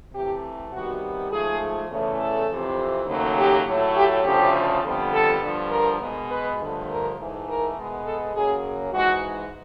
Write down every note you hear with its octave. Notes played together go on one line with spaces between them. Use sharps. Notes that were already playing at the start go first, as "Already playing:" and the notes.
C3 E3 A3 G4
C3 D#3 G3 B3 F#4
G#2 F3 A3 G#4
E2 C#3 E3 A3
A4
F2 C3 E3
D#2 C#3 F#3 A3
G4
A2 F#3 A3
G4
D2 C#3 F3 A3 G4
F2 D3 G3 B3
A4
G2 D3 F3
A#4
B2 G#3 B3
B4
G2 D3 F3 A3
A#4
G#2 E3 A3
A#4
B2 G#3 B3
A4
F#2 C#3 F#3 A#3 G#4
G#2 E3 G#3 F#4